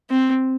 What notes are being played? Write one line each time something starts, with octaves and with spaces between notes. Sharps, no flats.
C4